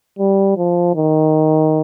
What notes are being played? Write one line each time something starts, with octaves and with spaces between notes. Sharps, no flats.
G3
F3
D#3